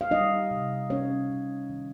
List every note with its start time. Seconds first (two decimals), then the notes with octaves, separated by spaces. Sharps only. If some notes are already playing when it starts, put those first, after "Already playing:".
0.01 F5
0.11 G3 D#4 D#5
0.51 C3
0.90 C#4 C#5
1.29 C3
1.70 D#3